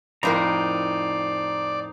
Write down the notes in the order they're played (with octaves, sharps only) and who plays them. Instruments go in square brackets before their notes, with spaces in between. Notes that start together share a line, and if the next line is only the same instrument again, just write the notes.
[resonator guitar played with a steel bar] F2 A2 A#4 [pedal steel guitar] D#4 C5 A#5 [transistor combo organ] D5